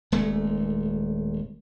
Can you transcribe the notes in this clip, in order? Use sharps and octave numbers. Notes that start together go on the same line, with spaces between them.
D#1 G#3 A3